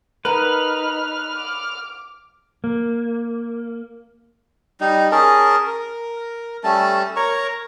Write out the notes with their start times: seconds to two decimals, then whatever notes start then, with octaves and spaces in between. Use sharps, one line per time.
0.25 D#4 A#4 B4 F#5 A#5 B5 F6
1.36 D6
2.64 A#3
4.80 G3 D#4
5.12 C#4 G#4 A#4 A5
5.67 A#4
6.64 G3 A3 C#4 A5
7.16 A#4 C#5 A#5 C#6